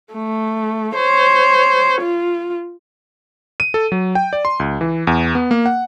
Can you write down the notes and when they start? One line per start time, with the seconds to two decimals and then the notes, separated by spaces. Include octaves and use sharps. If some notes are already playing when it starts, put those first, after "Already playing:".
0.13 A3
0.95 C5 C#5
2.02 F4
3.60 D#7
3.74 A4
3.92 F#3
4.15 G5
4.33 D5
4.45 C6
4.60 C#2
4.81 E3
5.07 E2
5.35 B3
5.51 A#3
5.66 F#5